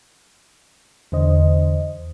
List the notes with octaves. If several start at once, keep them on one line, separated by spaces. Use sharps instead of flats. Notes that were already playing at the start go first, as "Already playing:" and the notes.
E2 D3 C5 D#5